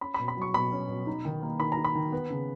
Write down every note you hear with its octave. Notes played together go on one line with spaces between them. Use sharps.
C#4 B5
B5
B2
B5
F#3 C#6
B2 B5
C#4
B2
D#4
D#3
A#3
D#3 B5
A#5
D#4
B5
D#3
B3
C#3